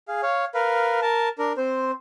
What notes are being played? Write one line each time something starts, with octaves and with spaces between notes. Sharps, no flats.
G#4 F5
C#5 F5
A#4 B4 F5
A#4 A5
D4 A#4
C4 C5